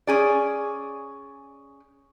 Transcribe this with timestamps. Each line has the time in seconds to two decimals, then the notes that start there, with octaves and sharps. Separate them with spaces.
0.07 C#4 G#4 D5